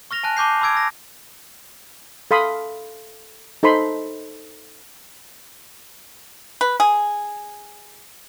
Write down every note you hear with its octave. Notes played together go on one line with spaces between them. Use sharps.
C#6 F6 A#6 F7
G#5 A5 F#6
A5 C#6 D6 G6 C7
B5 D6 E6 G#6 D7
E6 A#6
A4 F5 B5 C6 D#6
D#4 A4 C5 B5 C6
B4
G#4